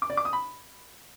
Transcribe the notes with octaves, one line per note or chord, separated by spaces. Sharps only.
D6
D5
D6
D#6
B5